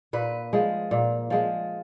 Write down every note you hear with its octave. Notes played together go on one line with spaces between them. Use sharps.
A#2 B4
F3 G#3
A#2
F3 G#3